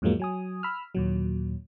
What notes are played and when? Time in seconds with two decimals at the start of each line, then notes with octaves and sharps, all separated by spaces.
0.02 E2 G#2 F3 F#3 G#3 A#3
0.20 F#3 G#5 D#6
0.63 B5 E6 F6
0.95 D#2 A#2 F#3